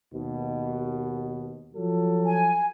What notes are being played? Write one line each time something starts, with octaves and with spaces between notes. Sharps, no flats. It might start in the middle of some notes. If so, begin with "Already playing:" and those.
D#2 B2
F3 F#3 A4
G#5